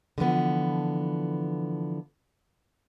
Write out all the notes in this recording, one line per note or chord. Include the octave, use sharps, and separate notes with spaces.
D3 E3 F3 B3